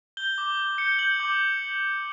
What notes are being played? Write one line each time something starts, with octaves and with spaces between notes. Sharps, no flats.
G6 G7
D6
D6
G6 C#7
G6 F#7
D6